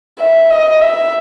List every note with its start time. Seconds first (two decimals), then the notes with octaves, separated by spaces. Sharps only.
0.19 E5
0.50 D#5
0.81 E5